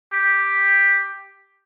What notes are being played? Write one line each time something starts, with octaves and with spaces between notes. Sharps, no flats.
G4